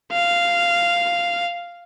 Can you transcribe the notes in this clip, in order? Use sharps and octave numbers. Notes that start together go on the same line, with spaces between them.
F5